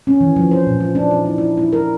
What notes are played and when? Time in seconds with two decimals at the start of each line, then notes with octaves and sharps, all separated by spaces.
0.07 C#4
0.21 E3
0.36 F3
0.51 C5
0.67 A#2
0.80 F4
0.95 D4
1.11 D#4
1.25 E4
1.38 E4
1.58 E4
1.73 A#4